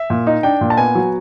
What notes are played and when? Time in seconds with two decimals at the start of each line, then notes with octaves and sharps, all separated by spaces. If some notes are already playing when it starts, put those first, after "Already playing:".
Already playing: E5
0.10 A#2
0.27 D#4
0.43 D4 G5
0.61 A#2
0.70 A5
0.77 B3 G#5
0.95 F#3